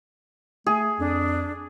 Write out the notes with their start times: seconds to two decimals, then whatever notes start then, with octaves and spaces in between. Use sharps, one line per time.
0.66 A3 G#4
0.99 F2 D4